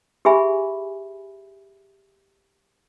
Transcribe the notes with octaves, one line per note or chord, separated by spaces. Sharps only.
G4 G#4 E5 G#5 B5